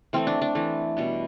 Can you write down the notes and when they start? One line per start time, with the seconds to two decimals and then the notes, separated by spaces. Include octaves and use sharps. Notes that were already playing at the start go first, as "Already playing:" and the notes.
0.13 E3 A3 C4
0.27 D4
0.42 D4
0.55 E3 A3
0.97 B2 G3 B3